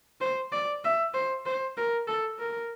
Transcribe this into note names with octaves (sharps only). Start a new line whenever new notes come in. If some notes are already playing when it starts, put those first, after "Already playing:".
C5
D5
E5
C5
C5
A#4
A4
A#4